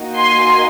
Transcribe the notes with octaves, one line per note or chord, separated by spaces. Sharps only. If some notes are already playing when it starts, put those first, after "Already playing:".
Already playing: A#3 D#4 F#4
G#5 C6